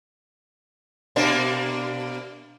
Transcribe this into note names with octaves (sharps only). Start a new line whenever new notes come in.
B2 A#3 D4